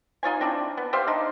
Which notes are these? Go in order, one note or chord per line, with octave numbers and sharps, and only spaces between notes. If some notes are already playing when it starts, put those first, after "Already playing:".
D#4 F4 C#5 G#5
C4 D4 E4
B3
G4 C5 E5 F5
D4 D#4